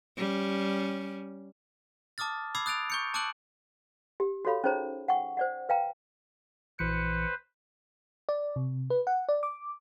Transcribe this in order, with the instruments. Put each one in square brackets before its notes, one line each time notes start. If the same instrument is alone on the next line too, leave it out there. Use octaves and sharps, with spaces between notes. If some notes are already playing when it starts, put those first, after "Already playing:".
[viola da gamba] G3 C#4
[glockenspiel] A5 D6 D#6 F6 A6
B5 D6 E6 G#6 C7
D#6 F#6 A6 D7 F7
C#6 G6 C#7
A5 D6 E6 F#6 D7 F#7
[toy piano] G4
F#4 G4 A4 C#5 F5 B5
C#4 D#4 G#4 C5 C#5 A#5
F#5 G5 C#6
C5 D5 F#5
B4 F5 G5 A#5
[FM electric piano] A#1 E3 C#7 [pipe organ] B4 C5
[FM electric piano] D5
C3
B4
F#5
D5
D6